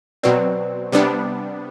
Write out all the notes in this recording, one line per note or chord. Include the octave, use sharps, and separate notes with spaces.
B2 F#3 C4 B4 D5
C3 G3 B3 D4